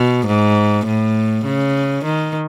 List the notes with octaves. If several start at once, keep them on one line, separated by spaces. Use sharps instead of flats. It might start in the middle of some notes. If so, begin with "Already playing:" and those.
Already playing: B2
G#2
A2
C#3
D#3